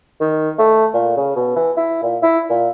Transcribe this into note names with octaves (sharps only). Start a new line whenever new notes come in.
D#3
A3
A#2
C#3
B2
E3
E4
A#2
E4
A#2